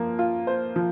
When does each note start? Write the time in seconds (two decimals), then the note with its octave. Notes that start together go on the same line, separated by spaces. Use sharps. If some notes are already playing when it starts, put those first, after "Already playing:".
Already playing: F3 A#3
0.19 F4
0.47 C5
0.76 F3